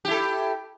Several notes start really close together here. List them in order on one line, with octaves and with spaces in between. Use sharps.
G4 E4 A4